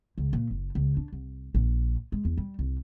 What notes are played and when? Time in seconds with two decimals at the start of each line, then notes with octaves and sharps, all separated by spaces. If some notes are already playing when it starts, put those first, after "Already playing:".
0.18 C#2
0.33 A#2
0.51 F#1
0.75 C#2
0.97 D4
1.12 C2
1.55 A#1
2.12 G#3
2.25 E2
2.37 G3
2.59 C2